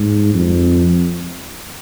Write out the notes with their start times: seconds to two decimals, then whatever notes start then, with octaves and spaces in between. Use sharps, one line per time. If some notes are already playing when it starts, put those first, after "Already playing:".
Already playing: G#2
0.34 F2